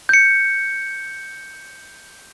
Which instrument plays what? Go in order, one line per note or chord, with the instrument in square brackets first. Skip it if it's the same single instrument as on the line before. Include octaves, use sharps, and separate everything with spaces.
[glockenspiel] G6 C#7